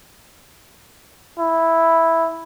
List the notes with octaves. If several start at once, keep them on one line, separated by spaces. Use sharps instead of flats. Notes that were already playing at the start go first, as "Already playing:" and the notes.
E4